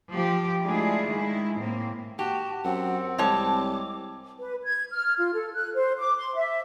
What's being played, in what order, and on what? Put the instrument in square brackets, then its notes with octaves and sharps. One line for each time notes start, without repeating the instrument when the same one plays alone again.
[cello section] F3 G4
G#3 A3 D4 E4 F4 G#4
D#3 G#3 E4
A2 A#3 C4
[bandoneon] F#4 [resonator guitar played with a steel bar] G4 [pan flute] A5
[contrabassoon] F#2 [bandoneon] C4 [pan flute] F#5
[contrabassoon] C2 [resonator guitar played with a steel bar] G#3 C#5 A5 [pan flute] D6
[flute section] B4
G#6
F6
F4
A4
F#6
C5
D6
C6
E5